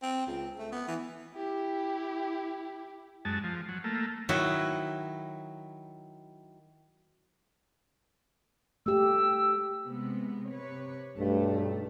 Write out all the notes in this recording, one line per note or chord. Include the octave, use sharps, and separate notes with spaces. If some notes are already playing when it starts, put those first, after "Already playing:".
C4
C#2
A3
B3
E3
E4 G4
F#2 G#3 A5
F3
F#3
A3 A#3
D#3 F#3 E4 B4 D#5
A3 G4 E6
C3 G#3 B3
C3 B4 C#5
B1 G2 A3